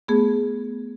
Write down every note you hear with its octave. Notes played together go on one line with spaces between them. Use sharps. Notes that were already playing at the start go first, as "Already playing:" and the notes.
A3 B3 G#4